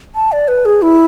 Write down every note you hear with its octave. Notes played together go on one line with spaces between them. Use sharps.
A5
D5
B4
G#4
E4